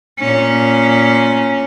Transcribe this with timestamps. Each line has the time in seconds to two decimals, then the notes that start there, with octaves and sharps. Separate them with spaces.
0.19 A#2 C#4